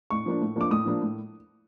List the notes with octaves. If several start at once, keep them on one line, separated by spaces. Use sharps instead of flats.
A2 C#6
F3 A#3 D4
A2
F3 A#3 D4 D6
A2 D#6
F3 A#3 D4
A2